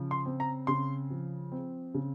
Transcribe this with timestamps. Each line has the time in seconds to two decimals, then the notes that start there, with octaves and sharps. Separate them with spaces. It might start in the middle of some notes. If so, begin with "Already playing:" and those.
Already playing: C#3 F3
0.11 C6
0.26 C4
0.40 A#5
0.67 C#3 C6
1.10 F3
1.52 C4
1.94 C#3